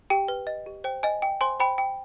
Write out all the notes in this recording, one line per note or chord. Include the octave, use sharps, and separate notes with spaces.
G4 G5
B4
D#5
G4
C5 G5
D#5 G#5
G5
C5 G#5 C6
C5 G5 B5
G5